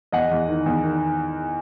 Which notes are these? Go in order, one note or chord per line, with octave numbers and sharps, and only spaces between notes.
E2 D#5 F#5
E2
D#3
E2
D#3